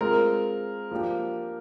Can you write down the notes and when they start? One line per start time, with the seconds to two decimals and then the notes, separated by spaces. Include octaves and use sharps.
0.01 G#3 C4 F4 A#4
0.91 F3 A#3 D4 G4